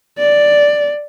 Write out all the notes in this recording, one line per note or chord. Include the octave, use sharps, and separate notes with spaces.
D5